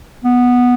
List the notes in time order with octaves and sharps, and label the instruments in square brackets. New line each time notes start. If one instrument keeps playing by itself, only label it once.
[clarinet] B3